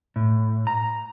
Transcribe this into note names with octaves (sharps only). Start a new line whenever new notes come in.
A2
A#5